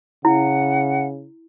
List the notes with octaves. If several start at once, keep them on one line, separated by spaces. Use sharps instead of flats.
C#3 E4 F#5